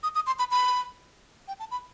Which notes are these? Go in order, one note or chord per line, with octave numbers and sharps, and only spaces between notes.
D#6
D#6
C6
B5
B5
G5
A5
B5